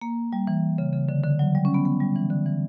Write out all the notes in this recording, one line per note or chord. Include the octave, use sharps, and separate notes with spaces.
A#3
G3
E3
C#3
C#3
D3
D3
F#3
G3
C#4
B3
B3
G3
E3
D3
E3